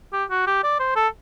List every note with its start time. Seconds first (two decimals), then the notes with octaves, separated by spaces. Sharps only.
0.13 G4
0.30 F#4
0.47 G4
0.64 D5
0.79 C5
0.96 A4